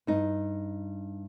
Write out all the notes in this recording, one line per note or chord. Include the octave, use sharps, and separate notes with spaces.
G2 D#4